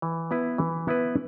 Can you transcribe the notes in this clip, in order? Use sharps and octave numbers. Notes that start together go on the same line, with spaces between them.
E3
B3 E4 B4
E3
B3 E4 B4